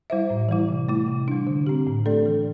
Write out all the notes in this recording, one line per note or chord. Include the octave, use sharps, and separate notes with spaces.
G3 E4 C5 E5
A2
E3 G3 E4
C3
A3 E4
C3
G3 D4
D3
C4 G4
A2
A3 D4 A4 D5
E3